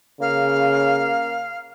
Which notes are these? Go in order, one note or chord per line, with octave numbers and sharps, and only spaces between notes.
C#3 A#3 F5